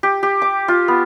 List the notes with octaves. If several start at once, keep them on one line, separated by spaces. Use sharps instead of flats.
G4
G4
D6
F4
B3